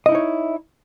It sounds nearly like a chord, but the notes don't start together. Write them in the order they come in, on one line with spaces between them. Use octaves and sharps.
D#5 E4 D#4 C#5